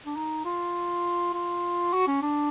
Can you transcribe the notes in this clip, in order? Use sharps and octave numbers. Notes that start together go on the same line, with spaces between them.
D4
D#4
F4
F4
F#4
C#4
D4